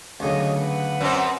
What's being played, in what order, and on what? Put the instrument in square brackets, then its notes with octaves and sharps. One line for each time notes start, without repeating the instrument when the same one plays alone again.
[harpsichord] D2 C#3 F#3 [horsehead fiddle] C#5 D#5
[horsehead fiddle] B4 F#5
[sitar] F#2 C4